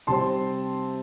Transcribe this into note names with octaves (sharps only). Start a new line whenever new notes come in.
C3 G3 C4 A5 C6